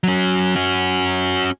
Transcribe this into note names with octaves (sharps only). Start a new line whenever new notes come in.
F#3 C#4
C#4 F#4